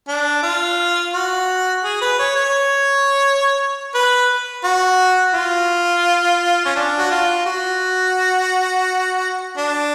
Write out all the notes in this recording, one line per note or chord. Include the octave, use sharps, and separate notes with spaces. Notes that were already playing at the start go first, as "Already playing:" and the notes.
D4
F4
F#4
G#4
B4
C#5
C#5
B4
F#4
F4
C#4
D4
F#4
F4
F#4
D4